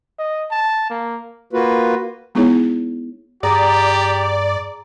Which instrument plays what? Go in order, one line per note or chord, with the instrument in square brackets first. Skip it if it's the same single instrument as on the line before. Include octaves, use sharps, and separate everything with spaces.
[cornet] D#5
A5
A#3
[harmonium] A#3 F4 F#4 B4
[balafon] G#3 B3 D#4 E4 G#4 C#5
[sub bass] G2 [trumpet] G4 [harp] G#4 A#5 [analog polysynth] D5